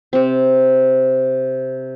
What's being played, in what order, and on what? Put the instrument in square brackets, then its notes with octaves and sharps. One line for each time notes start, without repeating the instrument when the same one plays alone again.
[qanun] C3 C4